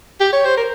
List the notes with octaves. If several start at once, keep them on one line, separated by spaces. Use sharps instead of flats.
G4
C#5
C5
A#4